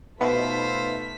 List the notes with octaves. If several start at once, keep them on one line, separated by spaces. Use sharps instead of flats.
B2 A3 D#4 F4 B4 C5 E5 B6